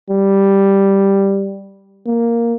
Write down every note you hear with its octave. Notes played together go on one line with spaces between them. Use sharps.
G3
A#3